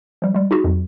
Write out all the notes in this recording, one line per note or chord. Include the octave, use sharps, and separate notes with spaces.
F3 G3
G3 G#3
D#4 F4 F#4 G#4
F2 F#3